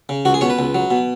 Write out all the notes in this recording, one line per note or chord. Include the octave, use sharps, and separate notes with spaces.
C#3
C#2 F#4
G#4
B2 C#5
B4
C#2
F#3
B2